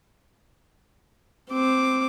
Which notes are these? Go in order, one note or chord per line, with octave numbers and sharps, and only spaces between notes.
C4 D6